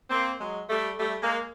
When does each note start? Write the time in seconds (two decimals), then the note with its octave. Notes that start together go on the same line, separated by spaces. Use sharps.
0.10 A#3 C4
0.40 F#3 G#3
0.70 G3 A3
0.99 G3 A3
1.21 G#3 A#3